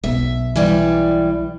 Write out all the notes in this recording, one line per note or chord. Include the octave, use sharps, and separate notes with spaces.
B1 B2 E5
E3 G3 D5